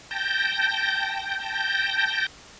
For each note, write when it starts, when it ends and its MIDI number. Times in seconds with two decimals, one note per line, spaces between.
0.11 2.26 79
0.11 2.26 81
0.11 2.26 91
0.11 2.26 94